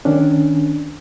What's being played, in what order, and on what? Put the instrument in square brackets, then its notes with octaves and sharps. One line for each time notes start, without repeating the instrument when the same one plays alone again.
[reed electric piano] D#3 C#4 D4